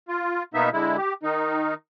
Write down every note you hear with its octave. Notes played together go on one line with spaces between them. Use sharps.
F4
B2 A#3 B3 D#4 E5
D3 G#3 E4
G4
D#3 D#4